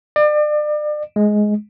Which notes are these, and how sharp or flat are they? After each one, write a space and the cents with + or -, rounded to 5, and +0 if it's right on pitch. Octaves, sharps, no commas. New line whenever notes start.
D5 +35
G#3 +10